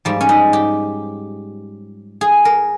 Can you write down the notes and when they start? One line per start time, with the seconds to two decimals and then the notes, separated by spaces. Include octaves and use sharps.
0.05 G#2 F3 G3
0.21 C#4
0.29 D#4
0.53 G4
2.21 G#4
2.45 A#4